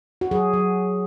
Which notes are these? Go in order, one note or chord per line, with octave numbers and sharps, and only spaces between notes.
F#4
F#3 G#4
F#3